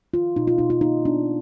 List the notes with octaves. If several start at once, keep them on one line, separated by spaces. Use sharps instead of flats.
D#3 F4
B2 D#4
F4
B2 D#4
F4
A#3 D#4
B3 D4